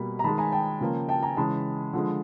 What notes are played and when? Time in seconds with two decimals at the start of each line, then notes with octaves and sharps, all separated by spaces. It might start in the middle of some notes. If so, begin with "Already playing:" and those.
Already playing: B2 G3 A#3 B5
0.19 A#5
0.24 D#3 G#3 A5 B5
0.38 G#5 A#5
0.52 G5 A5
0.81 C#3 F3 A#3
1.09 G5 A5
1.23 G#5 A#5
1.37 C#3 E3 G#3 A5 B5
1.93 D3 F3 G#3